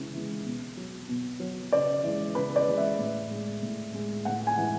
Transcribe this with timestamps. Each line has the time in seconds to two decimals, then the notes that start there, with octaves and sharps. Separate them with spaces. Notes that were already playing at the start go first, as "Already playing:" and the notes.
Already playing: C#3 E3 G#3
0.13 E3 G#3
0.45 B2
0.77 F#3
1.08 B2
1.40 F#3
1.72 C#3 D5
2.04 E3 G#3
2.35 C#3 B4
2.56 D5
2.67 E3 G#3
2.77 E5
2.99 A2
3.31 G#3
3.62 A2
3.94 G#3
4.25 A2 F#5
4.47 G#5
4.57 E3 G#3